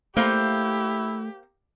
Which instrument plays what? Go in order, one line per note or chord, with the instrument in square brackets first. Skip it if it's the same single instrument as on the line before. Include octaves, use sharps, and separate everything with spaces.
[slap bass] A3 [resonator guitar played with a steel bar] A#3 C5 F5 [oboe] E4 [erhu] G4